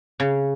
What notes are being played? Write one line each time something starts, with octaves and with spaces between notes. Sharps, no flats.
C#3